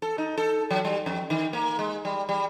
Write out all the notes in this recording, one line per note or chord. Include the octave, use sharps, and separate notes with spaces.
A4
D#4
A4
F#3
G3
F2
D#3
A#3
G#3
G3
G3